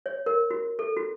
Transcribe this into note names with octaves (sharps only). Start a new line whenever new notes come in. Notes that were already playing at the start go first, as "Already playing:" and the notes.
C#5
A#4
F#4
A4
F#4